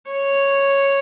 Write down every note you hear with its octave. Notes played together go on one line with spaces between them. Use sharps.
C#5